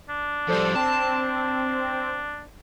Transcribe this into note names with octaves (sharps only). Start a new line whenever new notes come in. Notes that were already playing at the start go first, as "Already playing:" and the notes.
D4
F2 G3 A4 C5 D5
C4 A5